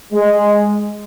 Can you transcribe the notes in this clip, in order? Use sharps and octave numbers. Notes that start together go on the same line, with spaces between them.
G#3